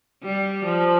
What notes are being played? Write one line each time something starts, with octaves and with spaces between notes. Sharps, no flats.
G3
F3